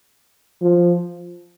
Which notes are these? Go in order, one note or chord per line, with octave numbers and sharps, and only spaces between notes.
F3